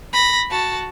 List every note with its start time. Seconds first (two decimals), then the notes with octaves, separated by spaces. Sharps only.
0.13 B5 A#6
0.50 F#4 A5